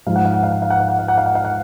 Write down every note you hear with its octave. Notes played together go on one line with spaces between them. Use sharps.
G#2 F3 G#3 F5
F#5
F5
F#5
F5
F#5
F5
F#5
F5
F#5
F5
F#5
F5
F#5
F5
F#5